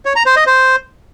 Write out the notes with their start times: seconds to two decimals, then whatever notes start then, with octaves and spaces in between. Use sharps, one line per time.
0.05 C#5
0.16 A#5
0.26 C5
0.36 D#5
0.47 C5